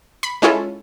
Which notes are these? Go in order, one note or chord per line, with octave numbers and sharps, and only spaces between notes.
B5
G#3 C#4 E4 F4 A4